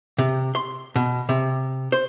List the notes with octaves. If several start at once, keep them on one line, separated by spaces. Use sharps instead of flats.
C3
C6
B2
C3
C5